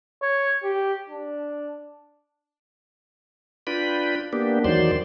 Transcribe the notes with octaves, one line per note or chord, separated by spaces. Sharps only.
C#5
G4
D4
D4 F4 B4 G5 B5
A#3 B3 D4 G4
E2 D#3 F#3 C5 D5 C6